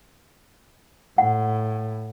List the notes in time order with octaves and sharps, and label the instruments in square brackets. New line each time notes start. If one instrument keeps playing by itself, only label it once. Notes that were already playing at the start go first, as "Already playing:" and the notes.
[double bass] A2 [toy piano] F#5